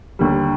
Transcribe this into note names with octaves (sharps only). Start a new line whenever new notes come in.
D#2 D3 G3